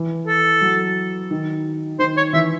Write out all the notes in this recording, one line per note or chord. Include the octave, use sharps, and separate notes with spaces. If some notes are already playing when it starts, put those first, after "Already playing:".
Already playing: E3
A4
F#3
D#3
D#3 C5
C#5
E3 E5